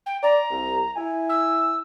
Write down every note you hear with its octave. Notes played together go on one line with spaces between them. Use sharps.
G5
D5 A#5
C2
E4 G#5
E6